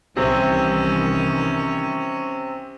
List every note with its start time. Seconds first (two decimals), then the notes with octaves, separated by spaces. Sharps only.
0.17 C2 C3 D#3 E3 C4 C#4 C#5